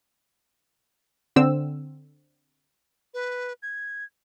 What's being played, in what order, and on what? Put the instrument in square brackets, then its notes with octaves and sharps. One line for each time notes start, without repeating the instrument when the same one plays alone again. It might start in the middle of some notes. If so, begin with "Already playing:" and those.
[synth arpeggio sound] D3 C4 E6
[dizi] B4
G#6